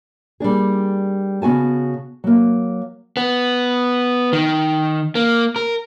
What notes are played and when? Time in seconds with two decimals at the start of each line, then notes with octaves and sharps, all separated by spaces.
0.40 G3 A#3 D4 G#4
1.42 C#3 B3 F#4 G#5 A5
2.24 F#3 A#3
3.17 B3
4.33 D#3
5.15 A#3
5.56 A#4